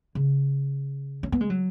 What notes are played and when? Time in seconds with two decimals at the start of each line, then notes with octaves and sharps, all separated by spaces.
0.15 C#3
1.23 C#4
1.32 B3
1.41 G#3
1.50 F#3